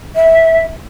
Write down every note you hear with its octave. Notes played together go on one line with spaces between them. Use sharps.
E5